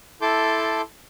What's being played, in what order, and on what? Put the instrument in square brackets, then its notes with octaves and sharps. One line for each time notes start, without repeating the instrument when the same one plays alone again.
[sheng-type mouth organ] E4 A4 A5 C6 D6 G6